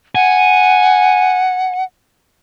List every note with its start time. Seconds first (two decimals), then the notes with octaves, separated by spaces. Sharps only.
0.15 F#5 G#5